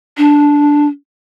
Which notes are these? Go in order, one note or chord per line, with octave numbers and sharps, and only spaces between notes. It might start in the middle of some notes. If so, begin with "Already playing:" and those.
D4